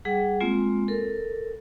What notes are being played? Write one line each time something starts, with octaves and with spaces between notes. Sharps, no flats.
G3 G#4 F#5 G5
G#3 A#3 C4 F4
A4 A#4